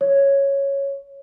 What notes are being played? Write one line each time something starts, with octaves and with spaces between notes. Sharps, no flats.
C#5